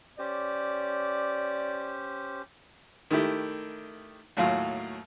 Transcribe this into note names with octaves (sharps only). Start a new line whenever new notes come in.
C#4 G4 C5 D5
D#3 A3 E4 G4
D#2 A2 F#3 F4 F5